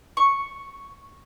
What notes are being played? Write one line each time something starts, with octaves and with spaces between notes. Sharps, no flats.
C#6